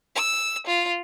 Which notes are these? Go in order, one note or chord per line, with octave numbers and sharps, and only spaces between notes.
E6
F4